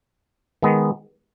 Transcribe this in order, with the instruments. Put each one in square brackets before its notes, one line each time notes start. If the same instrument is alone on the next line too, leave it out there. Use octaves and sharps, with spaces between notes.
[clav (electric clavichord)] D#3 G#3 B3